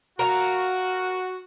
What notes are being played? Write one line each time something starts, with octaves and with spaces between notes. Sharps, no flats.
F#4 A#4 F5